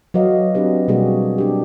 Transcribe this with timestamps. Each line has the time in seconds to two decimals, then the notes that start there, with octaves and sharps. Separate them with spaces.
0.14 F#3 F#4 B4 D#5 F5
0.55 C4 D4 G4 B4
0.88 B2 G3 A#3 F#4 G#4
1.38 D4 G4